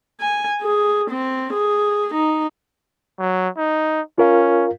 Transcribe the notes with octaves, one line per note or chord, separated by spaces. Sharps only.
G#5
G#4
C4
G#4
D#4
F#3
D#4
C#4 F4 A#4 F5